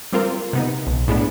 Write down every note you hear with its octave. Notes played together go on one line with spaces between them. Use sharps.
G3 C4 F4 A#4 C5
C3 B3 D#4
B1
A2 G#3 B3 D4